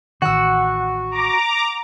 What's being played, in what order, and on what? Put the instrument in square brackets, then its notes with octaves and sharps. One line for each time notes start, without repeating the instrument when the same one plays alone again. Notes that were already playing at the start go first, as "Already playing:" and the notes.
[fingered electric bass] A1 D#3 [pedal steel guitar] F#4 [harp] F#5 E6
[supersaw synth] A#5 D6